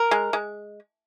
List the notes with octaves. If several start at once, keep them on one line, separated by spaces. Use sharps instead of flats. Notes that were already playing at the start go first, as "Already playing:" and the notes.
Already playing: A#4
G#3
G#3